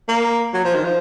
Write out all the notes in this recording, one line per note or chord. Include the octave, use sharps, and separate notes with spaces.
A#3
F#3
F3
D#3
F3